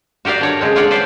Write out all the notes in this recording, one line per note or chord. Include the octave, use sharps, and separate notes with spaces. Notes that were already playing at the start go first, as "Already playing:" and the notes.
F#4 G4 A#4 D5 F5
D4 C#5 A#5
C#3 G#3 C4
D4 F4 C#5 D5 F#5
B4 C5 D5 F5